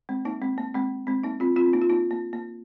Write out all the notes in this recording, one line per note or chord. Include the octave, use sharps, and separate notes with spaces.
G#3 C4
A#3 D#4
G#3 C4
A#3
G#3 C4
G#3 C4
A#3 D#4
C4 F4
C4 F4
C4
A#3 D#4
F4
A#3 D#4
A#3
A#3